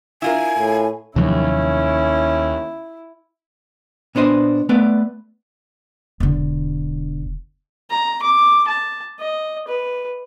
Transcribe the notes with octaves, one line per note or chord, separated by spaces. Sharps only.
E4 F4 A#4 G#5
A2
D#2 C3 F3 F#3 C#4 E4
A#2 B3 D4 C5 D#5
A3 B3 B4 D5
E1 D3
A#5
D6
A5
D#5
B4